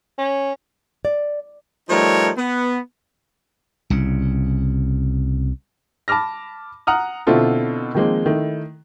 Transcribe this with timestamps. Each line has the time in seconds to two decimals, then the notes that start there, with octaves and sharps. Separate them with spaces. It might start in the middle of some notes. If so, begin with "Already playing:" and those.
0.19 C#4
1.05 D5
1.90 F3 G3 A3 D#4 A#4 C#5
2.38 B3
3.90 C2 C#3
6.08 A5 B5 D6 F6 A#6
6.87 F#5 A#5 D#6 F6
7.27 B2 D3 C4 E4 F4 A4
7.95 D#3 F3 G#3 A#3 C4
8.26 D#3 A3 E4